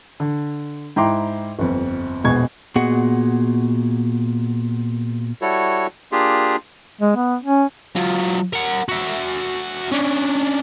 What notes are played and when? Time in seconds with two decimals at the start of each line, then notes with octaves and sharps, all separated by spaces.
0.20 D3
0.96 G#2 E4 G5 A#5 C6 D6
1.59 G1 F2
2.24 E1 A#1 B2 G#3 C#6 G#6
2.76 A#2 B3 F#4 G#4 D#5 F#5
5.42 G3 E4 F#4 A4 C#5
6.12 A#3 D4 F4 G4 G#4
7.01 G#3
7.16 B3
7.44 C#4
7.96 F#3 F4
8.53 A#4 F#5
8.89 F#4 E5
9.92 C#4 D4